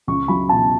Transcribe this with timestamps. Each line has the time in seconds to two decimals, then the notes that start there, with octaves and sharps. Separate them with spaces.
0.07 C#2 C#6
0.28 F#3 B5
0.49 B2 A5